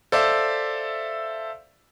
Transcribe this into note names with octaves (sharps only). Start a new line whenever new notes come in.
A4 C5 D5 E5 F5